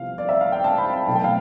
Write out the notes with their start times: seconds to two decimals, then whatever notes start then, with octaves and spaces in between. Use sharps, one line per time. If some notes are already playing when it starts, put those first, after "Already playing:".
Already playing: C2 C3 F3 B3 F5
0.18 D5
0.29 E5
0.41 F5
0.52 G5
0.64 A5
0.78 B5
0.93 A5
1.07 B1 B2 A3 A5
1.15 G5
1.24 F5